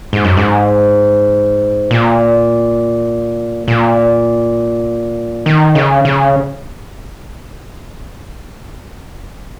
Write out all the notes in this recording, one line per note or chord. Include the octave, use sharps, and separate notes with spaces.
G#2
F#2
G#2
A#2
A#2
D#3
C#3
C#3